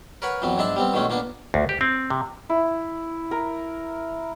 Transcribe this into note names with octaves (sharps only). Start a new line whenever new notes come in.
A#4 B4 C#5 F#5 B5
F2 E3 F#3 B3
G#2 G#3 D4 E5 A5 B5
G3 B3 C4
B2 D3 D#3 G#3 A3 C#4
A#2 A#3 B3 D4
D2
G4
C4
C3
E4
A#4